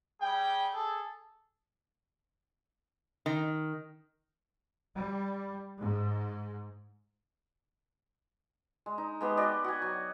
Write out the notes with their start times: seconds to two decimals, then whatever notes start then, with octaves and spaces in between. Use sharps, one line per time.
0.20 G3 G#4 G5
0.74 G#4 A4
3.26 D#3
4.96 G3
5.79 G#2
8.86 G#3
8.98 D#4
9.21 G#3 B3 G4
9.37 F#4 G4 D5 D#5
9.64 F#4 G#5
9.82 F#3